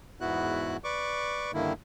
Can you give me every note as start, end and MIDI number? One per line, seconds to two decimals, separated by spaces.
0.21 0.77 40
0.21 0.77 44
0.21 0.77 59
0.21 0.77 64
0.21 0.77 66
0.21 0.77 90
0.84 1.51 71
0.84 1.51 74
0.84 1.51 85
0.84 1.51 86
1.54 1.73 43
1.54 1.73 50
1.54 1.73 51
1.54 1.73 58
1.54 1.73 64